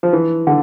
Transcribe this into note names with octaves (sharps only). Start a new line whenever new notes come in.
F3
E3
D3